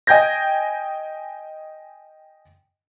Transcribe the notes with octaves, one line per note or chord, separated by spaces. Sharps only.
D#5 G5 G#5 G6 G#6 A#6